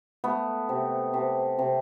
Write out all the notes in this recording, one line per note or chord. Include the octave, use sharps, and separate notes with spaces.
A3 B3
C3
C3
C3